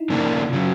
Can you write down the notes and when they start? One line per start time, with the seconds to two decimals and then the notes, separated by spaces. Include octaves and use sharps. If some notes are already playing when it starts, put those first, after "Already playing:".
Already playing: D#4 E4
0.10 C#3 F3 A#3 D4
0.50 F4
0.53 C#3 F#3 F#4